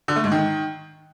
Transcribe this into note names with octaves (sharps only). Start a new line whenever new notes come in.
D3
A3
G#2
D#3